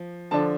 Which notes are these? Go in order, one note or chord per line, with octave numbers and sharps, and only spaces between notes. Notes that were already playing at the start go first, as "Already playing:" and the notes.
Already playing: F3
D3 F3 D4 A5